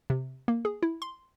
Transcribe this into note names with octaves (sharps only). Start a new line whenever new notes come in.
C3
A#3
G#4
E4
C6